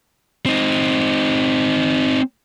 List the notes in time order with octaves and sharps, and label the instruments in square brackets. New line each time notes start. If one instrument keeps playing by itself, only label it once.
[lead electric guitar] C4 D#4